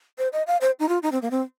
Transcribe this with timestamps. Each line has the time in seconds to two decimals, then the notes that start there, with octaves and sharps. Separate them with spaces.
0.18 C5
0.33 D#5
0.47 F5
0.61 C5
0.79 D#4
0.89 F4
1.02 D#4
1.12 C4
1.22 A#3
1.31 C4